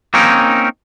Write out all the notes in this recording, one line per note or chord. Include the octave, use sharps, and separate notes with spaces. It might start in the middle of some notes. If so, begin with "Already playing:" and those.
A#3 C4 C#4 D#4 A#4